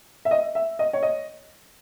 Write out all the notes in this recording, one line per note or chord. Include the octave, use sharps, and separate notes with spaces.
E5
D#5
E5
D#5
C#5
D#5